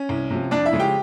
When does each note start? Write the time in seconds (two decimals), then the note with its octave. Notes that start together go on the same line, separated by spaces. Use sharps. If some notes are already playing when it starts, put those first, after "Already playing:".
Already playing: C#4
0.09 C2
0.31 C3 F3
0.51 F2 D4 D5
0.66 E4 E5
0.73 C#3 F3 G#3
0.80 G4 G5